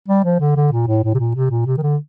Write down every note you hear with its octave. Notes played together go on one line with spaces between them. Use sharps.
G3
F3
D3
D3
A#2
A2
A2
C3
A#2
C3
A#2
C3
D#3
D3